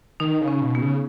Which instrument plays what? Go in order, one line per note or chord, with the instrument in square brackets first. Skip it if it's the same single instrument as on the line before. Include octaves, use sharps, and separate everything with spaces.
[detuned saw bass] D#3 [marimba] D#4
[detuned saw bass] C#3
[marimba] C#4
[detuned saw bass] B2
[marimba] B3
[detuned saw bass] C#3